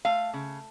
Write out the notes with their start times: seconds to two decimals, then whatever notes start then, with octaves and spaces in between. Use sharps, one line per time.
0.05 A3 F5
0.34 C#3